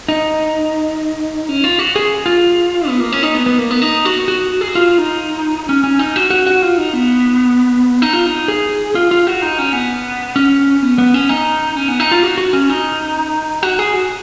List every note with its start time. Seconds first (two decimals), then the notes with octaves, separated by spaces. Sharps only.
0.08 D#4
1.49 C#4
1.64 F4
1.79 F#4
1.96 G#4
2.26 F4
2.88 B3
3.00 A#3
3.12 C#4
3.23 D#4
3.35 B3
3.46 B3
3.58 A#3
3.71 B3
3.82 D#4
4.05 F#4
4.28 F#4
4.61 G#4
4.68 F#4
4.75 F4
4.98 D#4
5.69 C#4
5.84 C#4
5.99 D#4
6.16 F#4
6.30 F#4
6.47 F#4
6.62 F4
6.78 D#4
6.93 B3
8.02 D#4
8.13 F4
8.26 D#4
8.48 G#4
8.95 F4
9.11 F4
9.27 F#4
9.42 D#4
9.59 C#4
9.73 B3
10.36 C#4
10.82 B3
10.98 B3
11.14 C#4
11.29 D#4
11.76 C#4
11.88 B3
12.00 D#4
12.11 F4
12.23 F#4
12.38 F#4
12.53 C#4
12.69 D#4
13.63 F#4
13.79 G#4
13.93 F#4